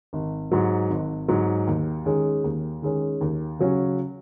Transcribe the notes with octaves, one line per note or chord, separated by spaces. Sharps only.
G#1
G#2 F#3
G#1
G#2 F#3
D#2
D#3 G#3 C#4
D#2
D#3 G#3 C#4
D#2
C#3 F#3 C#4